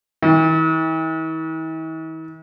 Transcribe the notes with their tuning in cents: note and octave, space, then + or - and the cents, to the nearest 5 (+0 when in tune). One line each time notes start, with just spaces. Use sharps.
E3 -45